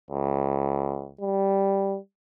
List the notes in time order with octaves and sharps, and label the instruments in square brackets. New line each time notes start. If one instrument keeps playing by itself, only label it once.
[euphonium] C#2
G3